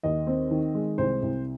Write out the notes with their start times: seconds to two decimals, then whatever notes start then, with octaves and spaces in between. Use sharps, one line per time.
0.03 D#2 D#5
0.27 C4
0.51 D#3
0.75 G#3
0.98 C2 C5
1.22 C2